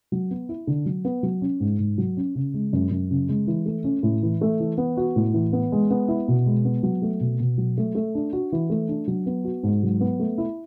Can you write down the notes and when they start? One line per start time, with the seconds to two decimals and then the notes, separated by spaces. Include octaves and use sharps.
0.12 F#3
0.31 B3
0.49 E4
0.67 D3
0.86 F#3
1.05 B3
1.23 F#3
1.42 C#4
1.60 G#2
1.79 G#2
1.98 F#3
2.17 C#4
2.35 C#3
2.54 G#3
2.73 F#2
2.91 F#2
3.10 C#3
3.29 G#3
3.47 E3
3.66 A3
3.84 C#4
4.03 A2
4.23 E3
4.41 A3
4.60 E3
4.78 B3
4.97 F#4
5.16 A2
5.34 E3
5.53 B3
5.72 G#3
5.90 B3
6.08 E4
6.28 B2
6.46 G#3
6.65 B3
6.83 F#3
7.02 A3
7.20 B2
7.40 B2
7.58 F#3
7.78 A3
7.95 A3
8.15 D4
8.33 F#4
8.52 E3
8.70 A3
8.89 D4
9.08 F#3
9.26 B3
9.44 F#4
9.63 G#2
9.83 F#3
10.00 B3
10.19 A3
10.38 E4